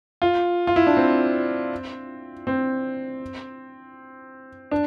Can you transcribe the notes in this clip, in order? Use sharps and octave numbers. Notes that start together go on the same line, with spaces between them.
F4
F4
E4
D4
C4
C4
D4